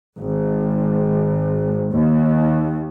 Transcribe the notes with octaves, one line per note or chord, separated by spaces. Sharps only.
G#1
D#2